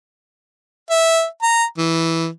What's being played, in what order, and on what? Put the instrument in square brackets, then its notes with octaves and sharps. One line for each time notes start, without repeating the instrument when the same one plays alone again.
[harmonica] E5
A#5
E3